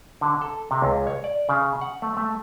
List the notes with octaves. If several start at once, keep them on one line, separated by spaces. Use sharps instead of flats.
D3
A4
C3
C#2
C#5
D5
C#3
F#5
A3
A3